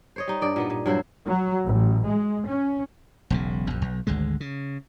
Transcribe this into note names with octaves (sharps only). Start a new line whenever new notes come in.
C5 C#5 D#5
G3 D#4
G2 D5 D#5
A#2 B3 D#4
A#2
G2 F#3 E4 C5
F#3
A1
G#3
C#4
E1 B1 C#3
A#1 F#2
B1
G#1 D2 D3 G#3
C#3